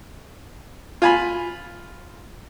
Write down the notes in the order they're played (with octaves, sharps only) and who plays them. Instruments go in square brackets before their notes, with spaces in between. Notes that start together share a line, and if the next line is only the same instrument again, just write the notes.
[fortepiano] F4 G#5 B5